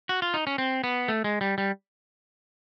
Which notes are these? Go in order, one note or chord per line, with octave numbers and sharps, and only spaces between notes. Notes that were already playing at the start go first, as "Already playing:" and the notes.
F#4
F4
D#4
C#4
C4
B3
A3
G#3
G3
G3